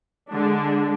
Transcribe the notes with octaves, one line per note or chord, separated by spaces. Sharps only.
D3 G#3 D4